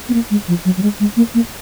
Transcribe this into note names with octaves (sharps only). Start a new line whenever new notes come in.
B3
A#3
G#3
F3
F#3
F#3
G#3
G#3
A#3
A#3